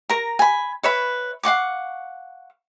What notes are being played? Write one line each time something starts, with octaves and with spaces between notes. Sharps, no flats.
A#4 A#5
G#5 B5
B4 C#5 E5 B5
F5 F#5 C#6 D6